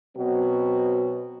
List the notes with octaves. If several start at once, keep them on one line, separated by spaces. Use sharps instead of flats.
B2 F#3 B3 C4 F#4